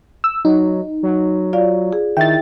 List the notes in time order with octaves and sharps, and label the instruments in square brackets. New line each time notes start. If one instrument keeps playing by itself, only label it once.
[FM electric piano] E6
[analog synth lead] F#3 [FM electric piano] D#4
[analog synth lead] F#3
[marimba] F4 D5 F5
G#4
[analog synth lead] D#3 [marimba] E4 E5 [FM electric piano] G5 A6